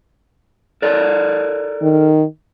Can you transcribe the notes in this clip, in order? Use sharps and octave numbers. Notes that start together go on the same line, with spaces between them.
A4 A#4 D5
D#3